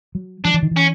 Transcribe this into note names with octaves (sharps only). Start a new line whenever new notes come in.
F#3
F3 D4
E3
D#3
E3
C#4